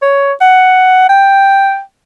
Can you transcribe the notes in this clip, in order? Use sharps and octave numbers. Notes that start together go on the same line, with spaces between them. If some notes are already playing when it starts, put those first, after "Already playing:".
C#5
F#5
G5